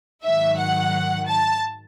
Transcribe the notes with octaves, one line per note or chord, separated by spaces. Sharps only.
G#2 D#3 F#3 E5
F#5
A5